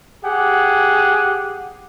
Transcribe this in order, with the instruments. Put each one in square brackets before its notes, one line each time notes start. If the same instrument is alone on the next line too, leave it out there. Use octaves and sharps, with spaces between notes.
[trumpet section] G4 G#4 F#5